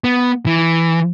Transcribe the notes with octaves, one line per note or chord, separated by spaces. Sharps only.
B3
E3